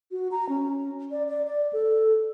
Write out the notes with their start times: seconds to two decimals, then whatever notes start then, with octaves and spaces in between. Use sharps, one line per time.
0.11 F#4
0.31 A#5
0.49 C#4
1.11 D5
1.28 D5
1.47 D5
1.73 A4